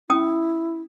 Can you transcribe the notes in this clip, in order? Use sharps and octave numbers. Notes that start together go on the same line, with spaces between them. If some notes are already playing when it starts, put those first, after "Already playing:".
C#4 E4 G5 D#6